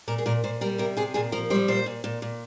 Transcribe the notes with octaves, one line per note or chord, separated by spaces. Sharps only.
A#2 A#4
G#4
A#2 A#4
A#2 C5
G3 A#4
C3 A#4
C3 G#4
A#2 G#4
F3 A#4
G3 C5
A#2 C5
A#2
A#2
A#2